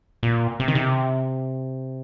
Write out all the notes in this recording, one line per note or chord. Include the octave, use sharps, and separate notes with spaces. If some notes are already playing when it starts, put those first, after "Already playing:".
A#2
C3
D#3
C3